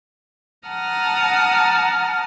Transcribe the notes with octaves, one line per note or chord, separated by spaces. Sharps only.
F#5 A5 A#5 D#6 F6